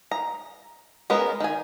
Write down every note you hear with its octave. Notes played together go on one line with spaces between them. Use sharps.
A#5
G#3 B3 C#4 A#4 B4
D#3 G#5